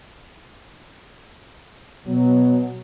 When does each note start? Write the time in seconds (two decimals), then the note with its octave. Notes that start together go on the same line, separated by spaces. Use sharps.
2.06 B2 F#3